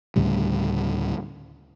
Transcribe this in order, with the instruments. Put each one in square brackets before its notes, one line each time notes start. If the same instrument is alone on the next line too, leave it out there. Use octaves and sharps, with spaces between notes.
[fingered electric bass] D2 A2 C#3 G3